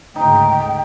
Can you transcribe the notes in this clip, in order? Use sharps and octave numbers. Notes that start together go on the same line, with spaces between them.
D2 G#2 C#3 D#4 G5